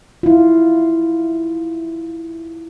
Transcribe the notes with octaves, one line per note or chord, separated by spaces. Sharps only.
E4 F4